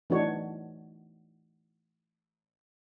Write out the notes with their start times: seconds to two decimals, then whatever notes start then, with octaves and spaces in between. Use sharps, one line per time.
0.10 E3 A3 D4 D#4 F#4 C#5